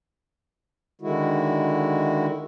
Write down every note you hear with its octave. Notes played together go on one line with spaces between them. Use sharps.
D3 D#3 G#3 E4 F#4